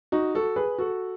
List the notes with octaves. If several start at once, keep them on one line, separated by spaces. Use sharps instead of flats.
D#4 F#4
F#4 A4
G#4 B4
F#4 A4